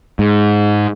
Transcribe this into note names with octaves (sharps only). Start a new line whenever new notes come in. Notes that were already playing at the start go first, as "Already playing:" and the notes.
G#2